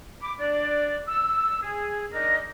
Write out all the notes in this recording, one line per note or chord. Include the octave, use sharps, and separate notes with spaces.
B5 D6
D4 D5
E6
G#4
D4 D#4 A#4 D5 D#5